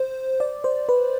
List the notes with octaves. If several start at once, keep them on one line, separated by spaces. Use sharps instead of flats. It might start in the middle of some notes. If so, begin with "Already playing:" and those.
Already playing: C5
D5
C5
B4